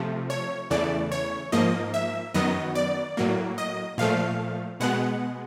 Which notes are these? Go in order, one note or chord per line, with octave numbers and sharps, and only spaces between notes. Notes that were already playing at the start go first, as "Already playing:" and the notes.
Already playing: C3 F3 A3
C#5
E2 C#3 E3 A3 D5
C#5
G#2 F3 A#3 D#5
E5
F#2 D#3 F#3 B3 D#5
D5
A2 F#3 A#3
D#5
A#2 F3 A3 F5
B2 G#3 B3 F#5